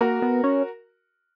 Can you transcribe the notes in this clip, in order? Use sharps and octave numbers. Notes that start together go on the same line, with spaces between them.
A#3 F#4 A#4
B3
C#4